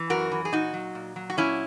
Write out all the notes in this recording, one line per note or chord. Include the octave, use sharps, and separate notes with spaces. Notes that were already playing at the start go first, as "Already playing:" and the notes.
Already playing: E3
F#2 F#4 A#4
E3
G#4
A#2 D#4 F#4
F#3
A#2
F#3
F#4
A#2 C#4 E4